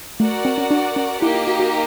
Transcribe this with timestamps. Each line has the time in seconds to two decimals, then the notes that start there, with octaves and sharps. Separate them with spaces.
0.20 A3 F#4 A#4 D5 F#5
0.45 C4
0.58 C#4
0.71 D4
0.96 C#4
1.21 A#3 D#4 E4 G4
1.35 F4
1.47 F#4
1.60 F#4